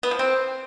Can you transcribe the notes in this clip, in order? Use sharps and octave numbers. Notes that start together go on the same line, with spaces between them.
B3
F3
C4